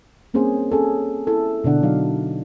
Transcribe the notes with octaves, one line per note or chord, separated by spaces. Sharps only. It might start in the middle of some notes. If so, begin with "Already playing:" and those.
G3 A#3 C4 C#4 G#4 C5
C#4 G#4 A4
E4 A4
B2 D3 D4 F#5
F#3 D#4 F5